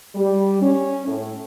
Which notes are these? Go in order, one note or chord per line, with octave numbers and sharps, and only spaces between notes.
G3
C#4
A2